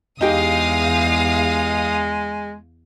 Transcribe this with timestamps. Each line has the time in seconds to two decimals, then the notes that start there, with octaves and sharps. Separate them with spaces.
0.21 E2 G#3 D#4 G4 F5 D#6